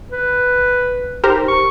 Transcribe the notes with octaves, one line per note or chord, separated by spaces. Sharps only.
B4
D#4 G4 A#4 C5
C#6